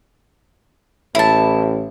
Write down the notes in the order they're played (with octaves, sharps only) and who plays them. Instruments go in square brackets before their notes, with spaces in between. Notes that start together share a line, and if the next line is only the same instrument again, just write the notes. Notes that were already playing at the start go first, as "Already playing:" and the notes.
[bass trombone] A1 [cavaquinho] E4 A5